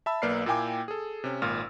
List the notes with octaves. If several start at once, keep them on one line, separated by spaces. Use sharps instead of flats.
E5 A5 B5 E6
B1 A#3 B4 D5 F6 C7
A#2 A#3 E4 G5 G#5 D6
G#4 A4
C3 C#4
G#1 A#2 F4 E6 F6